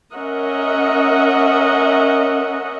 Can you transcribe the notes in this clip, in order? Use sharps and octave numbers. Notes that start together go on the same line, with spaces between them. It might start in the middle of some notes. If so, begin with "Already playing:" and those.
C#4 A#4 D#5 E5 F#5